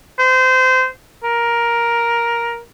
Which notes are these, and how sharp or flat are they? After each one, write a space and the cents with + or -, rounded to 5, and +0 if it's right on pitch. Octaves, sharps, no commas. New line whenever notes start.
C5 -25
A#4 +10